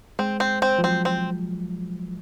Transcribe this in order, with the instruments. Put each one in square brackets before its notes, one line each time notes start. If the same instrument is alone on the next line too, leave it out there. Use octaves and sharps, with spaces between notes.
[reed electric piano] G#3 [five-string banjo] C4
[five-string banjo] C4
C4
[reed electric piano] F3
[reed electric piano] F#3 [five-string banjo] C4
[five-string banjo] C4